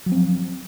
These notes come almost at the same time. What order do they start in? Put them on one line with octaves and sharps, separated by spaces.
F#3 F3 C4